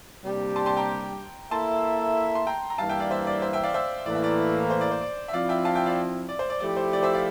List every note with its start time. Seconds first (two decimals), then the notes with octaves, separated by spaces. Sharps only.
0.23 C3 G3 A#3 D4 G4
0.56 A5 C6
0.66 A5 C6
0.77 G5 A#5
1.51 A#3 E4 A4 E5 A5 C6
2.35 C6
2.47 G5 A#5
2.70 A#5
2.78 G2 E3 G3 A#3 F5 A5
2.89 E5 G5
3.00 D5 F5
3.11 C5 E5
3.27 D5
3.42 C5 E5
3.53 E5 G5
3.63 D5 F5
3.74 C5 E5
4.06 A2 E3 A#3 D5
4.15 E5
4.24 D5
4.70 C5
4.81 D5
4.91 C5
5.01 D5
5.28 E5
5.33 F3 C4 E4 D5 F5
5.49 E5 G5
5.65 F5 A5
5.75 E5 G5
5.86 D5 F5
6.29 D5
6.39 C5
6.50 D5
6.60 F3 A3 E4 G4 D5
6.77 C5
6.93 D5
7.03 C5 E5
7.14 D5 F5